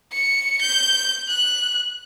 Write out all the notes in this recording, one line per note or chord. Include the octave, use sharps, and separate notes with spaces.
C#7
G6
F#6